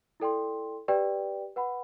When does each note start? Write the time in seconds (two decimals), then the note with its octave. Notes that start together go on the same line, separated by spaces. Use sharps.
0.20 E4 A4 D5 G5 C6
0.88 G4 B4 D5 G5
1.56 B4 F#5 B5